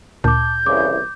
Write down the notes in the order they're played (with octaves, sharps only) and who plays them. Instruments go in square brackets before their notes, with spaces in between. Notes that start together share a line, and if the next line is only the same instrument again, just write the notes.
[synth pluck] D2 A#2 [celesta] A5 D6 [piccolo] G6
[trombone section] C2 C#3 E3 [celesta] D6